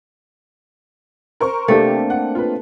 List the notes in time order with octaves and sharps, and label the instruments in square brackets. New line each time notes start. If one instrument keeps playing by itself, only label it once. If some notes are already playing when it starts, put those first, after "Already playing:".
[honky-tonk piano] A#4 C5 C#6
[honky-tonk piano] C3 G4 [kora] A3 [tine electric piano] A#3 C4 D4
[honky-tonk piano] F#5
F4 B4